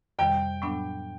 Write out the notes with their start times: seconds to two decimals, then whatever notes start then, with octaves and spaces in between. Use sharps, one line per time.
0.19 F2 C3 D#3 G3 G5
0.62 A2 F#3 B3 D4